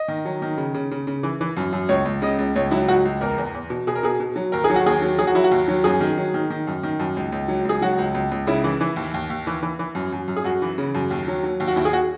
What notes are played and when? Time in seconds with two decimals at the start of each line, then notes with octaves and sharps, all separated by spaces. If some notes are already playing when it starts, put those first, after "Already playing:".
Already playing: D#5
0.08 D#3
0.25 F#3
0.42 D#3
0.58 C#3
0.74 C#3
0.91 C#3
1.07 C#3
1.23 E3
1.41 E3
1.57 F#2
1.73 F#2
1.89 C#2 C#5
2.05 C#2
2.22 C#3 D#5
2.39 C#2
2.55 C#2 C#5
2.71 F#3 E4
2.88 C#2 F#4
3.05 C#2
3.21 E2 A#4
3.38 E2
3.55 E2
3.70 B2
3.87 B2 G#4
3.96 A#4
4.03 B2 G#4
4.20 B2
4.36 F#3
4.52 D#2 A#4
4.64 G#4
4.70 F#3
4.76 F#4
4.86 D#2 G#4
5.02 F#3
5.18 F#3 G#4
5.27 F#4
5.35 F#3 E4
5.44 F#4
5.51 D#2
5.68 F#3
5.84 F#2 G#4
6.00 D#3
6.17 F#3
6.34 D#3
6.50 D#3
6.67 F#2
6.83 D#3
7.00 F#2
7.17 C#2
7.32 C#2
7.48 F#3
7.65 C#2 G#4
7.82 F#3 F#4
7.98 C#2
8.14 C#2
8.31 C#2
8.47 C#3 E4
8.64 E3
8.81 E3
8.96 D#2
9.14 D#2
9.30 D#2
9.47 E3
9.62 E3
9.79 E3
9.95 F#2
10.12 F#2
10.28 F#2
10.36 G#4
10.44 F#2 F#4
10.62 E3
10.78 C#3
10.95 F#2
11.11 D#2
11.28 F#3
11.44 F#3
11.60 D#2
11.68 F#4
11.76 D#2 E4
11.85 G#4
11.93 F#4